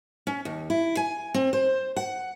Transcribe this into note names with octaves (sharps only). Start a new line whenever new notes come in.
C#4
D#2
E4
G#5
C4
C5
F#5